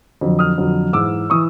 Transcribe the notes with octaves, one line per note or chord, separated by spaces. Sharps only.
F2 D3 F#3
D#6 F6
F2 D3 F#3
G#2 E3 D6 E6
E3 C#6 D#6